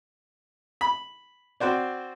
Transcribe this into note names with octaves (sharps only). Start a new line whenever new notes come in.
B5
C4 F#4 C5 D5